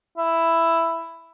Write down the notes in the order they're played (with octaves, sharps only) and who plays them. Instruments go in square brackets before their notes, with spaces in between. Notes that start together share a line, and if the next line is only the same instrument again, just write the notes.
[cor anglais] E4